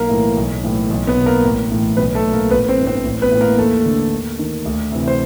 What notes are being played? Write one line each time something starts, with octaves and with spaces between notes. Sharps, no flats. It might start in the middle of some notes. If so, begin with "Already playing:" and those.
Already playing: B1 A#3 A#4
A2 E3
B1
A2 E3
B1
B3 B4
B2
A#3 A#4
A1
A2 E3
B1 B3 B4
A3 A4
A#2
A#3 A#4
A1 B3 B4
C4 C5
G2 E3
C4 C5
A1
B3 B4
A2 E3
A#3 A#4
D#2 A3 A4
D3
D#2
D#3
D2
C3 E3
C5